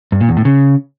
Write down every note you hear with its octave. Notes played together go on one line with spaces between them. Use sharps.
G2
A#2
E2
A2
C#3